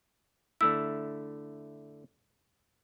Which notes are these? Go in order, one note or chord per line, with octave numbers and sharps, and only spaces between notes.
D3 A3 E4 E6